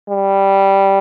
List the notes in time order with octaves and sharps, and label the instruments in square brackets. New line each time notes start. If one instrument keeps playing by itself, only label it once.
[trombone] G3